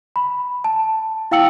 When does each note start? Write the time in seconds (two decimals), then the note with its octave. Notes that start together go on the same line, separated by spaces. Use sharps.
0.16 B5
0.64 A5
1.31 E4 F5 G5 E6 C#7 F#7